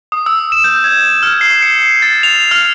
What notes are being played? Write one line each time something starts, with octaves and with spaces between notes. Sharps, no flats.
D#6
E6
E7
G6
G#6
F6
C7
C#7
A6
F7
F6